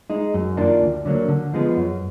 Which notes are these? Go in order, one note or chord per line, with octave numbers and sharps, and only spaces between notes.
G#3 D#4
F#2
D#3 A#3 D4 F4
D2
D3 F#3 A#3
D3
F3 G#3 B3
F#2